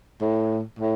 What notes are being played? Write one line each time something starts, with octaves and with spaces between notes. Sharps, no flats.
A2
A2